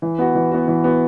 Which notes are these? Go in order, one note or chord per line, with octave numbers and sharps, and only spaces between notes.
E3
B3 F#4
E3
B3 F#4
E3
B3 F#4